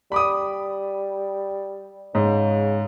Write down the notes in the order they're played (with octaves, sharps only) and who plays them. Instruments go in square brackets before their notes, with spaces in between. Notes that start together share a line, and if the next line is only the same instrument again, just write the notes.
[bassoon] G3 [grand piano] B5 D6 D#6
[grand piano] G#2 [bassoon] C#3